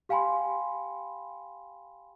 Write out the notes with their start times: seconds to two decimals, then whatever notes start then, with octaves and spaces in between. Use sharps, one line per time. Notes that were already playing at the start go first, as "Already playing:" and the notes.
0.09 G4 F5 G5 G#5 B5 C6